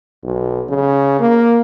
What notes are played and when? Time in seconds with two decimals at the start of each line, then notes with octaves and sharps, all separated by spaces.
0.24 B1
0.69 C#3
1.20 A#3